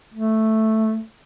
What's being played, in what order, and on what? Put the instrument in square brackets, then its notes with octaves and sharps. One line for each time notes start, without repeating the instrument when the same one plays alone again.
[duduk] A3